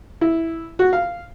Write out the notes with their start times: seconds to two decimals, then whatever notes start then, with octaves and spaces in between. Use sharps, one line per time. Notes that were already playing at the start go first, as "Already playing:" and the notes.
0.21 E4
0.79 F#4
0.93 F5